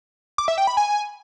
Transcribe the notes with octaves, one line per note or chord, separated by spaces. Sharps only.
D6
E5
G5
B5
G#5